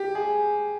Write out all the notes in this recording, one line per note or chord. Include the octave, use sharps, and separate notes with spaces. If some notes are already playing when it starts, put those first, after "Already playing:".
Already playing: G4
G#4